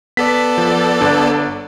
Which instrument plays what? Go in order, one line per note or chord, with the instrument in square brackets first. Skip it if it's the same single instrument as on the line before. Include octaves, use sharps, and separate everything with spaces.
[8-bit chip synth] B3 A4 D5 [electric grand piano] B6
[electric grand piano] F3
G1 D4